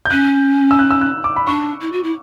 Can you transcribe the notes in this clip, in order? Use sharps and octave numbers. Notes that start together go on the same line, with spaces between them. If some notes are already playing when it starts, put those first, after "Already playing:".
G6
C#4 F#6
E6
F#6
E6
F#6
D6
B5
D4 C#6
E4
F#4
E4